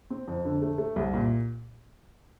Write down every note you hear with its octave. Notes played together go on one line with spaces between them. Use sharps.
C4
F2
D3
A3
A3
C2
A#2